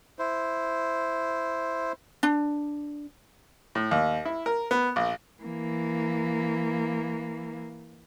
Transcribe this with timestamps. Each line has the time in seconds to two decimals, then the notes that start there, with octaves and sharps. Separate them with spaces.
0.19 E4 C5
2.23 D4
3.75 A2
3.91 D#2
4.25 E4
4.46 A#4
4.71 B3
4.96 A#1
5.43 E3 A#3